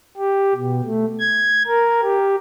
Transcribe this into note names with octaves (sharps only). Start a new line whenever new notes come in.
G4
B2
A3
G#6
A#4
G4